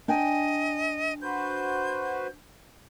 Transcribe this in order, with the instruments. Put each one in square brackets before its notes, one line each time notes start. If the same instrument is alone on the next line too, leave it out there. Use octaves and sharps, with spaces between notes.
[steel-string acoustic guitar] D4 G5 G#5 [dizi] D#5
[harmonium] F#4 B4 C5 [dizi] G6